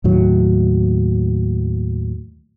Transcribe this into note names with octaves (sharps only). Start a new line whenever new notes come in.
D#2 A2 F#3